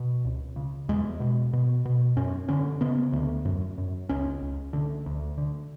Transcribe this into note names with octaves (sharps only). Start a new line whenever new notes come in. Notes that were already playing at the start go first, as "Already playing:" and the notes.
Already playing: B2
C#2
C#3
E2 G#3
B2
B2
B2
F#2 C#4
D3 C#4
C#3 B3
D2
F#2
F#2
C#2 C#4
C#2
D3
D2
D3